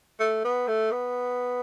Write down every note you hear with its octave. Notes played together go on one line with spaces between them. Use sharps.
A3
B3
A3
B3